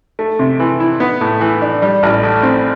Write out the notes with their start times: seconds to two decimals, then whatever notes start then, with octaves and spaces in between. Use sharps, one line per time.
0.19 A3
0.39 C3
0.60 E3
0.80 E4
1.00 B3
1.21 A2
1.41 E3
1.62 D4
1.82 G3
2.03 A1
2.23 A2
2.43 C4